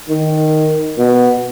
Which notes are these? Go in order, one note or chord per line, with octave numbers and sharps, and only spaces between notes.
D#3
B2